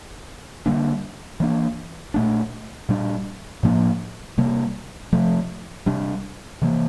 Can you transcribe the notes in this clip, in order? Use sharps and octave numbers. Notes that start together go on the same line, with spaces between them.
D3 G3 A#3 D4
E3 A#3 D4
A#2 A3 D4
A#2 G3 D4
A2 F3 A#3 D4
C3 G3 A#3
C3 F3 A3
C3 G3 D4
C3 E3 A#3